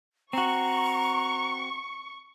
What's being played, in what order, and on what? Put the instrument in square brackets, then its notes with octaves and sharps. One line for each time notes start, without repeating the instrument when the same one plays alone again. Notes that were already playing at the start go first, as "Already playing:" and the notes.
[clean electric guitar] C4 F#4 [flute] A#5 [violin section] C#6